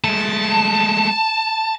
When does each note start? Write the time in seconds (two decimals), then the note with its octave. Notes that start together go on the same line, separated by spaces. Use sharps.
0.04 G#3 A3 A5